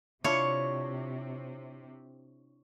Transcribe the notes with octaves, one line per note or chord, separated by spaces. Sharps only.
C3 D4 E4 F4 C#5 C#6